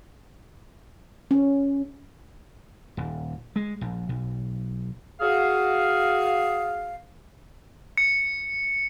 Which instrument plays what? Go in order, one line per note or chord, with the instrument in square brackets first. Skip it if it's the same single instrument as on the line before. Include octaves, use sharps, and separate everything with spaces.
[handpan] C#4
[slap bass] D#1
G#3
A#1
B1
[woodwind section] F#4 G#4 F5
[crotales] C#7